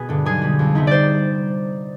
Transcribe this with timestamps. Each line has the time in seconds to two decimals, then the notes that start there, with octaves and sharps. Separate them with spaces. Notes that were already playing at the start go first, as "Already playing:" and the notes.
Already playing: B2 B3 G#4
0.09 G2 D3
0.25 B1 G#4
0.42 B2 G3
0.59 F2
0.75 C3 G3 B3 D#4
0.87 C5 D5